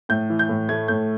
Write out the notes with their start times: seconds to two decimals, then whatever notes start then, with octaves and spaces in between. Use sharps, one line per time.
0.09 A2 G6
0.30 E3
0.39 G6
0.49 A2
0.69 A3 G#6
0.88 A2 G6